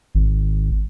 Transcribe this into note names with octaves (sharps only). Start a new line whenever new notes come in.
G#1